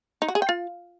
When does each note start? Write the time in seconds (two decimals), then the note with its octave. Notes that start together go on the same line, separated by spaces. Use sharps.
0.22 D#4
0.28 F#4
0.35 G#4
0.42 G5
0.49 F4